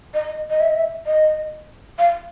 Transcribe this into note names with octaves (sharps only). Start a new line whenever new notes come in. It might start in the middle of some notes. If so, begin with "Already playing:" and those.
D#5
D#5
E5
D#5
E5
D#5
F5